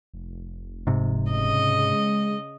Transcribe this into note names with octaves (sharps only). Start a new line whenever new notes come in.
F1
G#2 C3
C#3 D#5
G#3